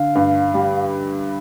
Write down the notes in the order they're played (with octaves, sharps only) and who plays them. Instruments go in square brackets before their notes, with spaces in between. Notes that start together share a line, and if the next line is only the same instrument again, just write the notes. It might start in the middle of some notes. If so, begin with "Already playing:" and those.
Already playing: [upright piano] D3 [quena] F5
[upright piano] G2
G3